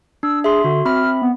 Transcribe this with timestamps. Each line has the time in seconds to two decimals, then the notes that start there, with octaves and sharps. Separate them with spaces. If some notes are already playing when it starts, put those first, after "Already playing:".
0.23 D4 E6
0.44 G#4 E5 C6
0.64 D3 F#4
0.85 C4 E5 B5 F6
1.22 B3